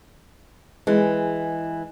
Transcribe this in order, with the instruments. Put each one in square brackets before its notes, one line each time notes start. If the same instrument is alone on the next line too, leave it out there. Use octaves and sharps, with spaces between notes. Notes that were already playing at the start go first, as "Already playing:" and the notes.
[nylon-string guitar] E3 G#3